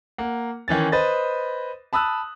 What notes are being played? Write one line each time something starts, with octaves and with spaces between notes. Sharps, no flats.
A#3 F#5
D#3 E3 C#4 A6
B4 C5 D#5 A6
A5 B5 D#6 E6 F#6